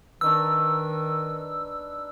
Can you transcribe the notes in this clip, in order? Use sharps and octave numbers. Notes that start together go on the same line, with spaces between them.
D#3 D4 D#4 B4 E6